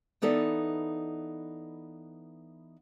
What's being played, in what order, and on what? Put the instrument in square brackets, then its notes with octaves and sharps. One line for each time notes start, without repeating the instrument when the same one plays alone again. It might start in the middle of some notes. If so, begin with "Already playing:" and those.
[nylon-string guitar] E3 B3 D#4 A4 D5 E5